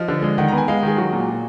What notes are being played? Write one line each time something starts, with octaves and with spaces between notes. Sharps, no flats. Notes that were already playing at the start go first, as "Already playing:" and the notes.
Already playing: F3 D#5
D3
G#3
D#3 F#5
A#5
B3
G#5
G#3 F5
D#3
G#4
F#3 F#4
A#2
A#2